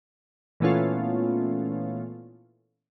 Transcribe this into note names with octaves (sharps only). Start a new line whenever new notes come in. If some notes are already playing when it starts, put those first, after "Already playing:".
A#2 E3 A3 B3 C#4 F4